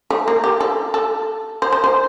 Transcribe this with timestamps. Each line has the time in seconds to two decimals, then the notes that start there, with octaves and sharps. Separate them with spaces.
0.10 A3
0.28 A#3
0.44 G4
0.60 A4
0.94 A4
1.62 C5
1.73 C5
1.84 C5